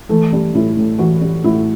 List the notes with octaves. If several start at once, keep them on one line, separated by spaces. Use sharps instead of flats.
E3 A3
G3
A2 E4
A2
E3 F#4
G3
A2 E4